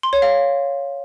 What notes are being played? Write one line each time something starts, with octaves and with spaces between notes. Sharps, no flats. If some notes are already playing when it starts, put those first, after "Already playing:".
C6
C#5
F5